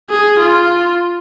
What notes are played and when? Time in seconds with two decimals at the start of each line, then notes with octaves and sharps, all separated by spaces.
0.10 G#4
0.39 F4